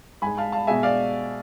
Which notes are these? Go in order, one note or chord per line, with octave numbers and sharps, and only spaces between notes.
G#2 G#3 G#5 B5
F5 A5
F5 A5
B2 G#3 E5 G#5
D5 F5